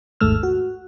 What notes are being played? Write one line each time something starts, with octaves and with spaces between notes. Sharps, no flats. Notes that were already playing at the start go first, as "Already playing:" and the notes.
G#1 D#2 G#2 A3 E6 F6
F#4